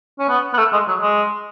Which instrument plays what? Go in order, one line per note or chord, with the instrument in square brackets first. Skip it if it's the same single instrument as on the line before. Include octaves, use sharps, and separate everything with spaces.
[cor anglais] C#4
B3
B3
A3
G#3
F#3
G#3